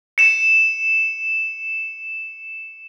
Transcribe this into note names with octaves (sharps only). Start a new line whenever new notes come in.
C#7 E7